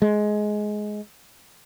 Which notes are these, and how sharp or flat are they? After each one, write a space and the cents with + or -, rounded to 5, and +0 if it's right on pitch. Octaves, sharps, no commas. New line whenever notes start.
G#3 +15